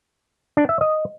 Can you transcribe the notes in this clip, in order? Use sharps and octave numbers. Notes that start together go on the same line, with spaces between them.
D4
E5
D#5